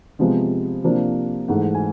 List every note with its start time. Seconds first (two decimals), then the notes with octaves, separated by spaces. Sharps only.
0.19 C3 F3 G#3 B3
0.84 C3 F3 A#3 D4
1.48 G#2 E3 A3 F#5
1.74 G#5